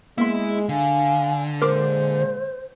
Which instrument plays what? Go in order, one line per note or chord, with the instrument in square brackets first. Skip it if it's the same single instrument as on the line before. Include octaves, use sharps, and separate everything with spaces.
[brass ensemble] G#3 [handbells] A#3 B3 C6 [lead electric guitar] E4
[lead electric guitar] D3 [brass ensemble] F5 [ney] G#5
[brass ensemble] A#2 G#3 [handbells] A#4 C6 D6 [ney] C5